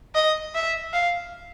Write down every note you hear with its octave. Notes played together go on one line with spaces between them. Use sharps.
D#5
E5
F5